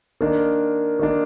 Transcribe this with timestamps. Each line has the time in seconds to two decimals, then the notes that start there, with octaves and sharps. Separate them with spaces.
0.21 D#3 A#3 D4
0.99 D#3 A#3 D4